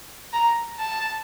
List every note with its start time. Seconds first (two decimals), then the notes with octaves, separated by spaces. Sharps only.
0.33 A#5
0.79 A5